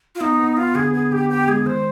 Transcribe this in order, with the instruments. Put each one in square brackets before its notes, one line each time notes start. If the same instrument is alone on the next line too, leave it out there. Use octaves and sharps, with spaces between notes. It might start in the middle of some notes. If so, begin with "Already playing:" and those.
[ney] F4
[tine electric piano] B3 [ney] D#4
[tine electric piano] B3
[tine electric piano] B3 [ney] F4
[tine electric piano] D3 [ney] G#4
[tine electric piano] B3 [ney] G#4
[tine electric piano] D3 [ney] G4
[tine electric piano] B3 [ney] G4
[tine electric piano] G#3 [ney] G#4
[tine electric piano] D#3 [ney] C5